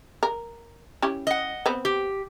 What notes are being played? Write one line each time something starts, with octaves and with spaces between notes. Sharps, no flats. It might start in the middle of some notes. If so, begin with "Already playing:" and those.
A#4
C#4 E4 G4
D#5 F#5
B3 C4
G4